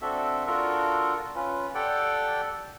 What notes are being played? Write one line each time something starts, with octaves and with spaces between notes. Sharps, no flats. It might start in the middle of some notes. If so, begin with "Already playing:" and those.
C4 D4 F#4 A4 E5
D4 F4 F#4 A4 A#4
C#4 F4 B4
G4 A4 D5 F#5 G5